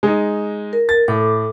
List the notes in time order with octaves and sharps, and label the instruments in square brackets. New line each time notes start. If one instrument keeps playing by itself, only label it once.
[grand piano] G#3 D#4
[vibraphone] A#4
[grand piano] A6
[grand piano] A2 [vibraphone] A4 D6